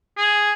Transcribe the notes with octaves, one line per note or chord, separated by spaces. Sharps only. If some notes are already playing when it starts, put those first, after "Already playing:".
G#4